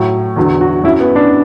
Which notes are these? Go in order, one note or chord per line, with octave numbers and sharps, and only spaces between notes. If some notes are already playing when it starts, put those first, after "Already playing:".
Already playing: A2 F#3
E2 D3 F#3
F#4
F#2 F#3 E4
B3
D4